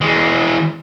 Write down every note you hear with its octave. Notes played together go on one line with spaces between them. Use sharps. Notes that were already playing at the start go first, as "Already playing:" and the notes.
E3 G#3